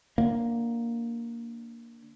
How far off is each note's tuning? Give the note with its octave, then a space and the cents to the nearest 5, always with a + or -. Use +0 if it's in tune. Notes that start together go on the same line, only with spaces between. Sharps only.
D3 +0 A#3 +0